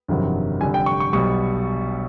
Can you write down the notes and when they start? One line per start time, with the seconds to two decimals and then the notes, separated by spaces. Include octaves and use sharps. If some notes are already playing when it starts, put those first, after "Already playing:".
0.08 G1 F2 C3 D#3 F#3
0.60 F1 F2 D3 G3 G#5
0.74 G5
0.86 C#6
1.00 C#6
1.13 B1 B2 G3 C#6